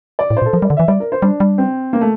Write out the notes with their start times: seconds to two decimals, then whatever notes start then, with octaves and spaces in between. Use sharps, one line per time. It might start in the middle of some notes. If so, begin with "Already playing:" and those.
0.19 D5
0.30 A2
0.37 C5
0.42 A#2
0.46 A4
0.53 F3 A#4
0.62 G3 D5
0.70 D3
0.77 E3 E5
0.88 G3 D5
1.00 A#4
1.12 C5
1.22 G3 D4
1.40 G3
1.58 C4
1.93 A#3
2.01 A3